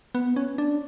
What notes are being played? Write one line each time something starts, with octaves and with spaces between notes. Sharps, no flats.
B3
C#4
D4